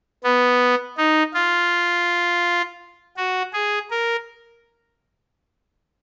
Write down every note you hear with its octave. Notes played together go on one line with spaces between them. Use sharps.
B3
D#4
F4
F#4
G#4
A#4